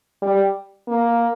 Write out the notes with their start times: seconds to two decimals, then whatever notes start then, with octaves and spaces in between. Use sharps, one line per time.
0.22 G3
0.88 A#3